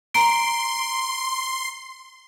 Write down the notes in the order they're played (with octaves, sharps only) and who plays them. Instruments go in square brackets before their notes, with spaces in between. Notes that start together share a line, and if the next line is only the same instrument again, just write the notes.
[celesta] A#5 D7 [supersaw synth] C6